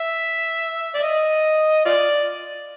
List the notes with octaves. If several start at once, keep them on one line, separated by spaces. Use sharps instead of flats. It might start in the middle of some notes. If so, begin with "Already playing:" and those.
Already playing: E5
D5
D#5
F4 D5